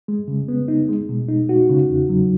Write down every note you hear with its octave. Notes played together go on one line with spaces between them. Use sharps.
G#3
C#3
B3
D#4
G#3
B2
D#4
F#4
C#3
E2
F#3